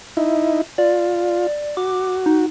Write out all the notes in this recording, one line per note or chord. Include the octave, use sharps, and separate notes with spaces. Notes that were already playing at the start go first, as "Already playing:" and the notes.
D#4 E4
F4 D5
F#4 D6
D#4